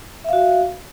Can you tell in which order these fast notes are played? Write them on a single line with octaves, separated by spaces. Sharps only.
E5 F5 F#4